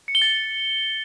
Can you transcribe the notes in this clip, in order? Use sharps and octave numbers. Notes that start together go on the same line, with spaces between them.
C#7
G7
A6